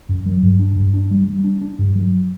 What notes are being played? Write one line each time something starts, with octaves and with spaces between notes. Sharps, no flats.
F#2
F#3
G2
D4
G2
D4
G3
G3
D4
D4
G2
F#3